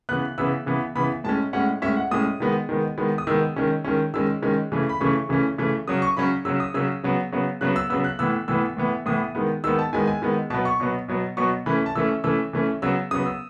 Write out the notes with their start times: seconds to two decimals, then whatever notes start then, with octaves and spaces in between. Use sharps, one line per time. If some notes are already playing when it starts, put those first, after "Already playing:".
0.09 C#3 E3 B3 F#6
0.38 C#3 E3 B3 E6
0.66 C#3 E3 B3
0.95 C#3 E3 B3 B5
1.24 A2 G#3 C#4 A5
1.53 A2 G#3 C#4 F#5
1.82 A2 G#3 C#4 E5
1.97 F#5
2.11 A2 G#3 C#4 D#6
2.40 D#3 G#3 B3
2.69 D#3 G#3 B3
2.98 D#3 G#3 B3
3.18 D#6
3.27 D#3 G#3 B3 E6
3.56 D#3 G#3 C#4
3.84 D#3 G#3 C#4
4.14 D#3 G#3 C#4 E6
4.42 D#3 G#3 C#4
4.72 C#3 E3 A3 C#4
4.89 B5
5.00 C#3 E3 A3 C#4 C#6
5.29 C#3 E3 A3 C#4
5.58 C#3 E3 A3 C#4
5.88 C#3 F#3 C#4 D#6
6.02 C#6
6.17 C#3 F#3 C#4 B5
6.45 C#3 F#3 C#4 E6
6.60 D#6
6.74 C#3 F#3 C#4 E6
7.03 C#3 F#3 B3
7.32 C#3 F#3 B3
7.61 C#3 F#3 B3 F#6
7.76 E6
7.90 C#3 F#3 B3 E6
8.04 F#6
8.19 A2 E3 B3 E6
8.48 A2 E3 B3 E6
8.77 A2 E3 B3
9.06 A2 E3 B3 D#6
9.35 D#3 G#3 B3
9.64 D#3 G#3 B3 E6
9.79 A5
9.93 D#3 G#3 B3 G#5
10.07 G#5
10.22 D#3 G#3 B3
10.50 B2 F#3 B3 A5
10.65 C#6
10.80 B2 F#3 B3
11.08 B2 F#3 B3
11.37 B2 F#3 B3 C#6
11.66 E3 A3 C#4 B5
11.86 A5
11.95 E3 A3 C#4 E6
12.24 E3 A3 C#4 E6
12.53 E3 A3 C#4
12.82 C#3 F#3 B3 E6
13.11 C#3 F#3 B3 D#6
13.26 E6